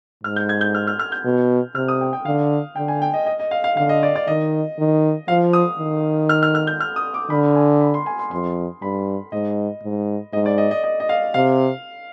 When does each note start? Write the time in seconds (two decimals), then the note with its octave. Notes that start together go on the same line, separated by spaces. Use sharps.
0.23 G#2 F6
0.36 G6
0.49 G#6
0.61 G6
0.75 F6
0.87 F6
0.99 F6
1.12 G6
1.25 B2
1.75 C3 F6
1.88 D#6
2.01 G5
2.13 G5
2.25 D3 F5
2.76 D3 G5
2.88 G#5
3.02 G5
3.14 D#5
3.26 D#5
3.39 D#5
3.51 F5
3.64 F5
3.77 D3 F5
3.89 D#5
4.03 D5
4.16 D5
4.27 D#3 D#5
4.79 D#3
5.28 F3 F5
5.53 D#6
5.79 D#3
6.29 F6
6.43 F6
6.55 F6
6.67 G6
6.80 F6
6.96 D#6
7.14 D6
7.30 D3 B5
7.55 G#5
7.81 B5
7.94 C6
8.06 G#5
8.19 C6
8.31 F2 C6
8.82 G2 B5
9.32 G#2 D#5
9.83 G#2
10.33 G#2 D#5
10.46 D5
10.58 D#5
10.71 D#5
10.84 D#5
11.00 D#5
11.09 F5
11.34 C3 F5